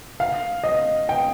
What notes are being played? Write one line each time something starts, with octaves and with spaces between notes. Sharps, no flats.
F5
D#5
G5